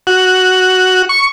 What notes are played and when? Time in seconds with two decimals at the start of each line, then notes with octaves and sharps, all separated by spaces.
0.07 F#4
1.09 C#6